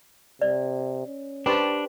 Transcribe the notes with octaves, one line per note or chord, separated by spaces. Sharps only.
C3 D5
C#4
D4 G4 B4 C5 G5 A5